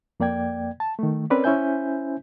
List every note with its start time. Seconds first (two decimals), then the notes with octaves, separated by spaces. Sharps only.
0.20 F2 A#3 D5 G5 G#6
0.80 A5
0.99 D#3 A3
1.30 C4 C#4 A#4 B4 C#5 D5
1.44 C#4 E4 C5 E5 G#5 G6